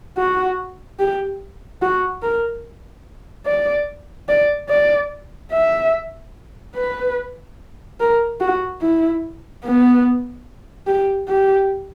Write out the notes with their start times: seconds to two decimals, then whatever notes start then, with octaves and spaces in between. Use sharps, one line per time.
0.17 F#4
0.99 G4
1.82 F#4
2.23 A#4
3.46 D5
4.29 D5
4.69 D5
5.52 E5
6.76 B4
8.00 A#4
8.40 F#4
8.82 E4
9.64 B3
10.87 G4
11.29 G4